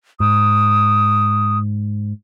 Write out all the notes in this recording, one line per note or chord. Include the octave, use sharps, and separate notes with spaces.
G#2 D#6